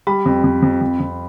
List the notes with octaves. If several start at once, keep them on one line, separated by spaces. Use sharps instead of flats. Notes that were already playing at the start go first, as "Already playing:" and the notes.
G3 B5
F2
F2
F2
F2
F2